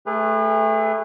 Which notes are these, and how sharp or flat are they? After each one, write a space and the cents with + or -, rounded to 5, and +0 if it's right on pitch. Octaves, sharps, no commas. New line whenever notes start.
A3 -5 G#4 -40 B4 +0